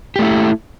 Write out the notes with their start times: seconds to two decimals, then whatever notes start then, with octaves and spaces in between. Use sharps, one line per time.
0.16 G4
0.19 A3
0.22 E4